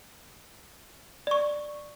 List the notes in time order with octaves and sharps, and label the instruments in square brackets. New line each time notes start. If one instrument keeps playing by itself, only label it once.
[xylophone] D5 C#6